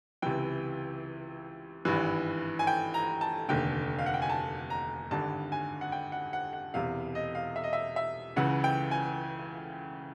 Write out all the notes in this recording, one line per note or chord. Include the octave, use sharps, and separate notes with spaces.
C#2 C3 E3 G5
G#1 G2 E3
G#5
G5
A#5
A5
F1 D#2 D3 G5
F5
F#5
G5
G#5
A5
A#5
G#1 G2 D3 A5
G#5
F#5
G5
F#5
F#5
F#5
E1 E2 C3 F5
D#5
F5
E5
D#5
E5
E5
C#2 C#3 E3 F#5
G5
G#5